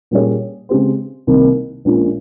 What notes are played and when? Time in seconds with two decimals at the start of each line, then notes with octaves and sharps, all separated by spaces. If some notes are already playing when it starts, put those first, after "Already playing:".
0.11 A#2 G3 C#4 G#4 C#5
0.69 C#3 G#3 C4 G4 C5
1.27 C2 C3 D#3 A#3 D#4
1.85 A#1 A#2 G#3 C#4 F4